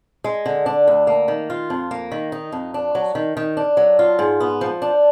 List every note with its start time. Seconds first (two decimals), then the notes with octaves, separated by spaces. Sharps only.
0.24 G#3
0.46 D3
0.66 D4
0.87 D2
1.07 A#3
1.28 D#3
1.50 F4
1.70 F2
1.91 A#3
2.12 D#3
2.32 D#4
2.52 F2
2.74 D4
2.95 F#3
3.15 D#3
3.37 D#3
3.57 D4
3.77 F#3
3.99 F4
4.19 G#2
4.40 B3
4.61 F3
4.82 D4